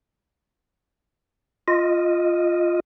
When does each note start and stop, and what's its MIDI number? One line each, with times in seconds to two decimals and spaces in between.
1.68 2.80 65
1.68 2.80 75